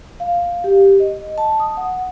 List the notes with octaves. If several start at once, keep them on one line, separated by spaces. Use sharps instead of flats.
F5
G4
D#5
A5
D#6
F#5